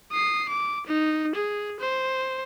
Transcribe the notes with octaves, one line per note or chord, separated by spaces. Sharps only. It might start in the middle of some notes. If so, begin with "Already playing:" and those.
D#6 C7
D6
D#4
G#4
C5